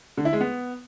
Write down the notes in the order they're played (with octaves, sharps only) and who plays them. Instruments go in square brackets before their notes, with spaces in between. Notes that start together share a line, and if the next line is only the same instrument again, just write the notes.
[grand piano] D3
E4
G#3
B3